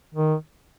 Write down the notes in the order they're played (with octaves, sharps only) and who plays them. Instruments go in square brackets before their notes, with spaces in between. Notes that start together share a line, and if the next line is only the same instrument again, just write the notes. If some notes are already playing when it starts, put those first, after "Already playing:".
[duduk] D#3